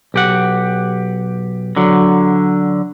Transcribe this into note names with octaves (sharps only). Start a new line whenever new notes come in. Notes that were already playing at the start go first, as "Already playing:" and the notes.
B1 G4 F#5
D3 F#3